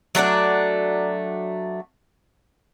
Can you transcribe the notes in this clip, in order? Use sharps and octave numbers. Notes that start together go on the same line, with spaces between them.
F#3 A3 D4 D5